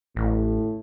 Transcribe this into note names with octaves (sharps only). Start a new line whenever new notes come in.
A1 A2